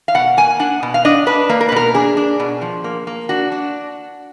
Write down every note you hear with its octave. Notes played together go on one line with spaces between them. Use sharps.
F5
B2 F#5
A#3 G#5
D4 F#5
B2
F5
D4 D#5
D4 B4
A#3
A#4
B4
B2 A#4
D4 G#4
D4
B2
F3
A#3
A#3
D4 F#4
D4